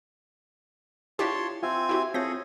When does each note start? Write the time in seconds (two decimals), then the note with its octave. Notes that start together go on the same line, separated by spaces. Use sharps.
1.19 D4 E4 F4 G4 C#5 A5 C6 C#6
1.63 C4 F4 E5 G#5 E6
1.89 E4 F#4 G4 E5
2.14 C4 F4 G#4 A4 C#5 G6 A#6